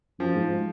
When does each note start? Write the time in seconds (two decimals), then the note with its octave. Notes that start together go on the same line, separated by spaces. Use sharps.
0.19 F#2 F3
0.35 G#2